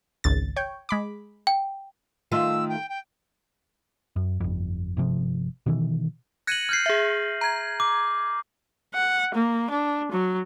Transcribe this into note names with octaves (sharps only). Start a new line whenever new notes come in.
G#1 C#2 A6
C#5 G5
G#3 B5 D6
G5
D#3 A3 F4 E6
G5
G5
F#2
G1 F2
G1 C3 F3
B2 D#3 E3
F#6 G#6 A#6 C#7 D#7 F#7
F6 G6 C7
G#4 E5
A#5 G#6
D6
F#5
A#3
D4
F#3